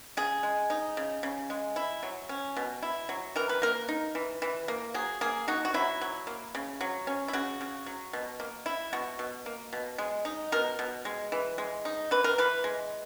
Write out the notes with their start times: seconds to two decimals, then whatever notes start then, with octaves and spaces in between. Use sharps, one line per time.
0.17 C#3 G#4
0.43 G#3
0.70 D#4
0.97 C#3
1.23 C#3
1.50 G#3
1.76 E4
2.03 F#3
2.29 C#4
2.56 B2
2.83 E4
3.09 F#3
3.36 E3 A#4
3.49 B4
3.62 A#3 A#4
3.89 D#4
4.15 E3
4.42 E3
4.68 A#3
4.94 F#3 G#4
5.21 A#3 G#4
5.48 D#4 F#4
5.65 F#4
5.74 F#3 E4
6.01 F#3
6.27 A#3
6.55 C#3
6.81 F#3
7.07 C#4
7.28 E4
7.33 C#3 F#4
7.61 C#3
7.86 F#3
8.13 B2
8.40 A#3
8.66 E4
8.93 B2 F#4
9.19 B2
9.46 A#3
9.73 B2
9.98 G#3
10.25 D#4
10.52 B2 A#4
10.79 B2
11.05 G#3
11.32 E3
11.58 G#3
11.85 D#4
12.11 E3 B4
12.24 A#4
12.38 E3 B4
12.64 G#3